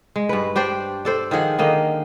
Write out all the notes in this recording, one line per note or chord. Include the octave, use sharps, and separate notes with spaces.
G#3
G2 B4
D4 G4 C5 D5
D4 A4 C5
D#3 F3 G#4 F#5
D3 D#3 A#3 D#5